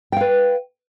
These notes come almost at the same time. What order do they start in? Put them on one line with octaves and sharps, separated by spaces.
G5 F5 B4